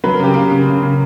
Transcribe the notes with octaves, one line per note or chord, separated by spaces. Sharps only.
F#3 B4
A#4
C#3 G4
C#3 A#3 A#4
C#3
C#3
C#3